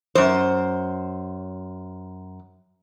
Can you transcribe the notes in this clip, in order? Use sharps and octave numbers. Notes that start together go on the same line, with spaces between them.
F#2 C5